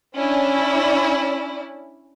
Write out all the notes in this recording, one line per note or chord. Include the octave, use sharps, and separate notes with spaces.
C#4 D4 E4 D5